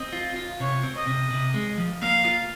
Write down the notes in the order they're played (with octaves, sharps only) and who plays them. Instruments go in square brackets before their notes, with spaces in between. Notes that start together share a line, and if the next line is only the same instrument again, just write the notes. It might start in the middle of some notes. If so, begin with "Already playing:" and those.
Already playing: [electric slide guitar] C4 [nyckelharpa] D#5
[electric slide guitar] F4
F4
[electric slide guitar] C3 [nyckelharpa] C#5
[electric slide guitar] C4
[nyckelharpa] D#5
[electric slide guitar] C3
C3
G#3
F3
[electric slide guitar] A#3 [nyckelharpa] F5
[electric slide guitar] F4